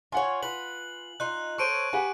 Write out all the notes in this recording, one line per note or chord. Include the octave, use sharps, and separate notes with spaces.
F4 C#5 F#5 G#5
F4 B4 F#7
D#4 F4 F#6
A4 C5 C#5 C#6 D7 D#7
G4 B4 F#5 G#5